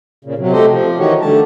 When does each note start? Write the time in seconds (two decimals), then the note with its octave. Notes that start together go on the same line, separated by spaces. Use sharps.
0.25 A#2 C#3
0.38 C3 F#3
0.53 A3 G4 A4 C5 D#5
0.70 F3
0.99 D#3 E3 D#4 F#4 G4 C#5
1.21 D3 G3 A3 A5